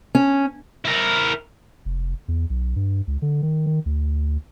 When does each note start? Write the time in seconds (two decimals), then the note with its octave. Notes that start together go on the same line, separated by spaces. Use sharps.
0.15 C#4
0.85 E4 A#4
1.85 F1
2.28 E2
2.50 B1
2.76 G2
3.07 C#2
3.22 D3
3.42 D#3
3.66 D#3
3.86 D2